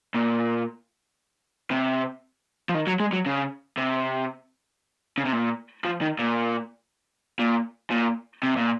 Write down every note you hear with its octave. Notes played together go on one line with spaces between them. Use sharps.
A#2
C3
F3
D#3
F#3
G#3
F#3
C#3
C3
C#3
C3
A#2
F3
D#3
A#2
A#2
A#2
C3
A#2